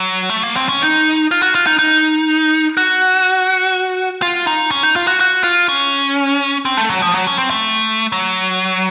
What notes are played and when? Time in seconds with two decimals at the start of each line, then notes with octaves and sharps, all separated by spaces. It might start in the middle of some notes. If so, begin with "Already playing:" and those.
Already playing: F#3
0.30 A3
0.43 A#3
0.56 C4
0.69 C#4
0.82 D#4
1.31 F4
1.42 F#4
1.55 F4
1.67 D#4
1.79 D#4
2.77 F#4
4.22 F4
4.47 D#4
4.71 C#4
4.83 D#4
4.96 F4
5.07 F#4
5.21 F#4
5.44 F4
5.69 C#4
6.65 C4
6.77 A3
6.90 F#3
7.02 F3
7.14 F#3
7.27 C#4
7.38 C4
7.50 A3
8.12 F#3